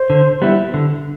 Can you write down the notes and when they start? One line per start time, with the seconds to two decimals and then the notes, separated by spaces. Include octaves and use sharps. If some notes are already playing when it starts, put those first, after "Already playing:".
Already playing: C5
0.10 D3
0.42 G3 B3 E4
0.74 D3